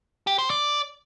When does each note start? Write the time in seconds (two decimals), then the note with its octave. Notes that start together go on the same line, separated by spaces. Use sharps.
0.27 G4
0.39 C5
0.50 D5